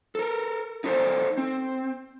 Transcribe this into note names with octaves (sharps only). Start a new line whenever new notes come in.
A4 A#4
D#4 E4 A4 A#4 C5 D5
C4